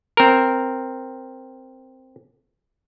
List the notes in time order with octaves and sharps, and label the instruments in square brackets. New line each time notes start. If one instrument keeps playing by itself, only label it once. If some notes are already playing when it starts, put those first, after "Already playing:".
[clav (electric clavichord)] C4 A#4